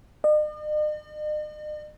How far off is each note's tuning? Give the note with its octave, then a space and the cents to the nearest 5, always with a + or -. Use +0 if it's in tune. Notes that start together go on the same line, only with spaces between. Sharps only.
D#5 -45